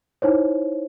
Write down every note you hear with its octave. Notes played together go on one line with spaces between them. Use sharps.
D#4 E4 C5 C#5